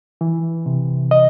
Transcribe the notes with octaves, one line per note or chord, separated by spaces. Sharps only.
E3
C3
D#5